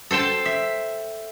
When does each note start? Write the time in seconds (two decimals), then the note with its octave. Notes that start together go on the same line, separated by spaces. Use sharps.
0.11 A4 C5 G5 A5
0.46 E5